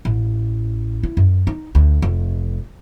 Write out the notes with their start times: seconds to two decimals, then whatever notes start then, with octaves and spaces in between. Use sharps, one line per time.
0.05 A1
1.03 E4
1.17 F#2
1.47 D#4
1.75 D2
2.02 F1